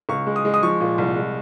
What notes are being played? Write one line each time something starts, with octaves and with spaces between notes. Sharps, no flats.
C#2 C#6
G#3
D#6
G#3
D#6
F3 C#6
A#2
C2
G#3